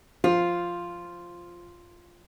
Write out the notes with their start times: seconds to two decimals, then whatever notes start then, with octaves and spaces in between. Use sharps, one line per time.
0.24 F3 F4